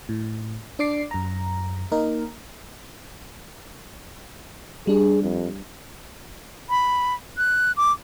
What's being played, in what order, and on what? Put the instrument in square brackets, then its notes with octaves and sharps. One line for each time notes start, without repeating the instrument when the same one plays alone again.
[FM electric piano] A2
D4 D5 D6 C7
F#2 A#5
A#3 D#4 A#4
[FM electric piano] G3 D4 [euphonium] G#4
[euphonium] F2
[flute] B5
F#6
D6